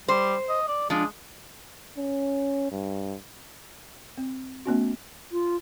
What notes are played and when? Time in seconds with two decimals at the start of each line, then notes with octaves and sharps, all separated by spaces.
0.08 G3 C5
0.49 D#5
0.68 D5
0.90 F3 G#3 D4
1.97 C#4
2.71 G2
4.18 C4
4.66 A3 B3 C#4 F#4
5.32 F4